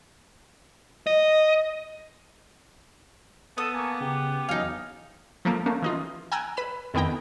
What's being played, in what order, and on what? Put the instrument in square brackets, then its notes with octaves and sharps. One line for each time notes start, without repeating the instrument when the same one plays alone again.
[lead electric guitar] D#5
[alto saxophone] B3 [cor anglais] A4 [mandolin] D#6
[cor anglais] A#3 [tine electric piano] G#5 A5 C#6
[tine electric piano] C#3 [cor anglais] G4
[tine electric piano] E2 F#3 G#5 [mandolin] D#4 F5
[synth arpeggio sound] F3 A3 A#3
A3 A#3 C#4
E3 D#4 F4
G5 G#5 A#5 E6 F#6 G#6
B4 B5 E7
F2 D#3 B3 E4 G5 A#5